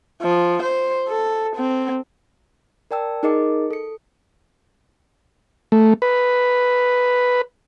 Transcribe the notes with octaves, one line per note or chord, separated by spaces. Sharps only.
F3
C5
A4
C4
A#4 D5 G5 A5 E6
D#4 G#4 A#4 D#5 D6 C#7
A4 C#7
A3
B4